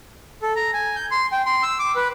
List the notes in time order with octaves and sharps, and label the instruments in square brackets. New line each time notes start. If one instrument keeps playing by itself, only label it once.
[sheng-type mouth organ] A4
A#5
G#5
G6
C6
G5
C6
E6
D6
B4